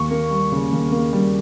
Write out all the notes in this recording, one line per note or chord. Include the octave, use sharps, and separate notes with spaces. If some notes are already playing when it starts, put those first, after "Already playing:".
Already playing: D#2 C#6
A#3
G3
C#3
D#2
A#3
G3